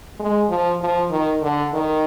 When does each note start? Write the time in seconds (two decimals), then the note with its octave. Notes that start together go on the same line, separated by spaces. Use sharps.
0.19 G#3
0.49 F3
0.81 F3
1.10 D#3
1.42 D3
1.73 D#3